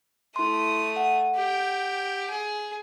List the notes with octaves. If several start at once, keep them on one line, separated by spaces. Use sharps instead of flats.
A3 E4 C6 D#6
F#5
G4 G5
G#4